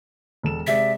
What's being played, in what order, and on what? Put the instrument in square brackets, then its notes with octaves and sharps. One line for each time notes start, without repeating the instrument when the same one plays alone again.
[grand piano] E1 A4 E7
[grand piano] C3 G#3 D5 [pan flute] E5